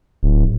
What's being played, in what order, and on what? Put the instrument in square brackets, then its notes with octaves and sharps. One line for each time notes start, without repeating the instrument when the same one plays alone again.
[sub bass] D1